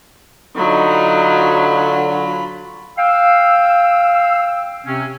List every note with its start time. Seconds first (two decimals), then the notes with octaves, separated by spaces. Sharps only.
0.57 D3 F#3 D#4 F4 B5
2.98 F5 G5 E6
4.86 C3 C4 C#4